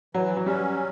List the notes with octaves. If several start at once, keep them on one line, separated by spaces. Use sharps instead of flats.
E3 F#3
F#3
G3 C#4